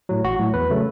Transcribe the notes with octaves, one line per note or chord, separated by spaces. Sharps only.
A2 F#3
A1 F#4
A2 F#3
E2 B4
C#3 F#3 A3